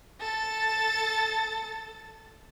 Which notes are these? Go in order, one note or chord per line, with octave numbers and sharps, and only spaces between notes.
A4 A6